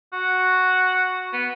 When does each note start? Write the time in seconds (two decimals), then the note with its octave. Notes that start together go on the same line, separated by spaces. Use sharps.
0.13 F#4
1.33 B3